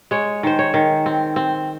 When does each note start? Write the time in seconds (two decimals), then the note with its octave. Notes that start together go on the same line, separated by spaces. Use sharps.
0.11 G#3 C#5
0.43 D#3 C5
0.59 C#5
0.74 D#3
1.06 C4
1.36 C4